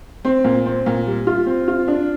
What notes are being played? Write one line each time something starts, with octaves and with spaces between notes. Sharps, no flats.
C4
A#2
C4
A#2
G3
F4
C4
F4
D4